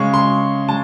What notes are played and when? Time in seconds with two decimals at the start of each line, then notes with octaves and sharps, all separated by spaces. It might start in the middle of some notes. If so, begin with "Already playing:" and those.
Already playing: C#3 G#3 C#6
0.14 C6
0.69 G#3 A5